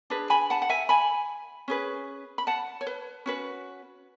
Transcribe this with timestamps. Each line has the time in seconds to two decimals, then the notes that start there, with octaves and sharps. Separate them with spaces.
0.10 D4 G#4 B4
0.30 G#5 B5
0.50 F#5 A5
0.62 F#5
0.70 E5 G#5
0.89 G#5 B5
1.68 C#4 G#4 B4
2.38 B5
2.47 F#5 A5
2.81 C#5
2.87 B4
3.26 C#4 F#4 B4